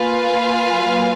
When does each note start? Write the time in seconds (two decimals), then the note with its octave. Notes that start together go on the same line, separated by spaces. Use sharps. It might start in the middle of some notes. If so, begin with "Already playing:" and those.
Already playing: A#3 F4 B4 F5 G#5
0.69 F#3